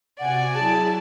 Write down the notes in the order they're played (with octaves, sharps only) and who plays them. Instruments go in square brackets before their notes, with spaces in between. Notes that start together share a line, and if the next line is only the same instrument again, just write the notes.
[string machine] C3 F#4 [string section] D5 G#5 [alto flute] F#5
[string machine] F#3 E4 [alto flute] G#4 [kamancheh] A5